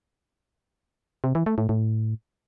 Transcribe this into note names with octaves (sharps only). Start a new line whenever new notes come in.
C3
E3
A3
A2
A2